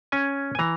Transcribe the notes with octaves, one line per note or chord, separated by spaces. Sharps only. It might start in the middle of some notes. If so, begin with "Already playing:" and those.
C#4 G#5
G#5
E3 A#5